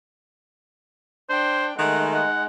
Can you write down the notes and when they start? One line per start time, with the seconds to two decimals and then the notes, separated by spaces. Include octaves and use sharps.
1.30 D4 C5 G5
1.78 D#3 G#3 A3 D#4 F#5
2.14 F#5